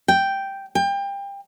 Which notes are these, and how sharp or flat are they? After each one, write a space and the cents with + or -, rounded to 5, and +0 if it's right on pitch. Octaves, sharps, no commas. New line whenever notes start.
G5 -5
G5 +30